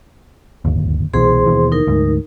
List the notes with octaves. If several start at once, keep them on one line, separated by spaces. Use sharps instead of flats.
D1 G1 D#2
C2 B2 E3 G#4 C5 C6
D#2 B2 E3
D#4 A#4
D2 G#2